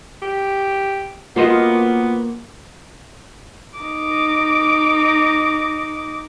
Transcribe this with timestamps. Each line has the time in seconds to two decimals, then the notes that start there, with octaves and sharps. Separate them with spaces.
0.22 G4
1.36 A#3 B3 F4 F#4 C5 D#5
3.78 D#4 D6